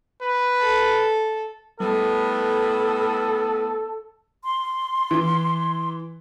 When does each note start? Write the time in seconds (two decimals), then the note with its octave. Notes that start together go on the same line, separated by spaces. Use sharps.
0.21 B4
0.59 A4
1.80 A2 G3 B3 A4
4.44 C6
5.11 E3